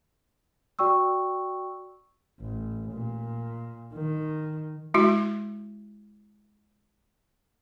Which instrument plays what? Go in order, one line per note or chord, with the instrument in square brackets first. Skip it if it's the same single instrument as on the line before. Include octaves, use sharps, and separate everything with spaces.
[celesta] F#4 D5 G5 C#6 E6
[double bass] A1
A#2
D#3
[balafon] G#3 E4 F#4